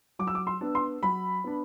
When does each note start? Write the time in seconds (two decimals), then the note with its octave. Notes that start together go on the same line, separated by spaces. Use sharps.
0.19 F#3 D6
0.27 E6
0.35 D6
0.47 C6
0.61 B3 D4
0.75 C6
1.03 F#3 B5
1.44 B3 D4